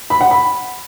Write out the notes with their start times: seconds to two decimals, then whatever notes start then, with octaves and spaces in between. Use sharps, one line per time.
0.10 B5
0.21 F#5
0.31 B5